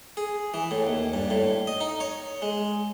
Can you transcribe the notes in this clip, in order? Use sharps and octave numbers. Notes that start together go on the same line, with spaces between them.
G#4
E3
A2
D#2
G2
A2
D#5
D#4
C#5
G#3